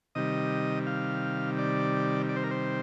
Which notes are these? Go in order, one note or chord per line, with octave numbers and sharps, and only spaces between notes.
C3 D#3 G3 D#5
F5
D5
D5
C5
A#4
C5